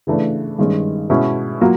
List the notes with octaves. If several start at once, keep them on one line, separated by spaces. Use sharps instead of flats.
C#3 E3 A3 D4
G2 D#3 G#3 C#4
B2 G#3 C#4 E4
F#3 A#3 F4